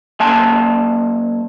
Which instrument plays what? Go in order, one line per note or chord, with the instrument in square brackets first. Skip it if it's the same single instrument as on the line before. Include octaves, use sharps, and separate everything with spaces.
[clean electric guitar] F#2 A#3 E5 G#5 A5